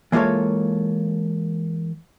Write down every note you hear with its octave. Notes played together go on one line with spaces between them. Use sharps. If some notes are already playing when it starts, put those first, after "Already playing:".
E3 G#3 A#3 F4 A4 C#5